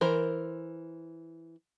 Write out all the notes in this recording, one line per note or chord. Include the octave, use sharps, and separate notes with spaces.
E3 A#4 C5